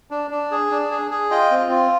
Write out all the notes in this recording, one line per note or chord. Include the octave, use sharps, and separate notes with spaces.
D4
D4
G#4
D4
G#4
G#4
F4 D#5 G5
C4
F4